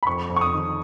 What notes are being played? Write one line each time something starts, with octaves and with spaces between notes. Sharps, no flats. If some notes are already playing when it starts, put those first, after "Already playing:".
B5
F2 C#6
F2
C#6
D#6
D#3